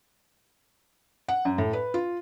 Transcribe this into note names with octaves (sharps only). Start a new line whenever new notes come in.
F#5
F#2
A2
B4
F4